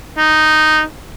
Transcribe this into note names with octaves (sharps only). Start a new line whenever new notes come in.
D#4